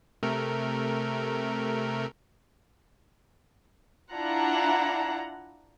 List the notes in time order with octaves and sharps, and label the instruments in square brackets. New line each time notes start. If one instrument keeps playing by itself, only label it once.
[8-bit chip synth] C3 A3 A#4
[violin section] D4 E4 F4 F#5 A#5